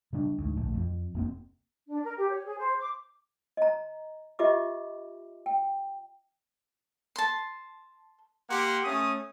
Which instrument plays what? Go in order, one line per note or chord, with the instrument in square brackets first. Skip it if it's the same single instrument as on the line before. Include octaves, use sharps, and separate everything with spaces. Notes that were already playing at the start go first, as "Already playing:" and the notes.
[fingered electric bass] C#3 G3 D4
D2 G#2
D1 A#1 A2
F2 F3
F1 A#3 C4
[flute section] D4
A#4
G4
C#5
G#4
C5
D6
[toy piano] D#5 A#5
F4 G4 D#5 E5 B5 D6
G5
[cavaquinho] A5 C6
[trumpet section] A#3 G4 F#5 C6
A3 C#4 D#6